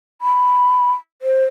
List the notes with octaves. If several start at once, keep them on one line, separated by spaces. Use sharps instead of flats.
B5
C5